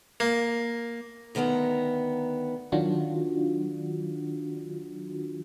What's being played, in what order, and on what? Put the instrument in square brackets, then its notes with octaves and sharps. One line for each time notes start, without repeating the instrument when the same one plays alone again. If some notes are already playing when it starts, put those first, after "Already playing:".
[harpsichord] A#3
[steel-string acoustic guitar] D2 D#3 B3 G#5 A#5
[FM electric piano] D#3 F#3 D4 F4 F#4